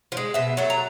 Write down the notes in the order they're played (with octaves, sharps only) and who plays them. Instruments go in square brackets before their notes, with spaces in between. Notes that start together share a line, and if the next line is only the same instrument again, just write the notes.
[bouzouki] F3
G#3
B2 E5
F#3 A3
A#5